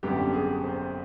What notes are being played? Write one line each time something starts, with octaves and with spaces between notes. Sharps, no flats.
G#1 F#2 D3 G3 B3 G4
G#4
C5